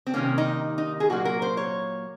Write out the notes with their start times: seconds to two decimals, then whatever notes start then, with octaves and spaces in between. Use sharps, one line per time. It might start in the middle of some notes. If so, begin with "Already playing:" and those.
0.07 C4
0.14 C3 D#3 A#3 C#4
0.38 D#4
0.78 D#4
1.00 G#4
1.10 A#2 F#3 A#3 F#4
1.25 A#4
1.42 C5
1.57 C#5